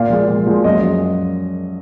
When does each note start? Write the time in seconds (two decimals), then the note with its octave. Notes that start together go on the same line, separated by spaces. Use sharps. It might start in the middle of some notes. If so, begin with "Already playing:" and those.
Already playing: A#2 F5
0.10 F3 G#3
0.28 A#2
0.47 F3 G#3
0.64 F#2 D#5